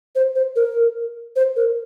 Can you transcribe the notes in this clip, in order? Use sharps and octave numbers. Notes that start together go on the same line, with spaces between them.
C5
C5
A#4
C5
A#4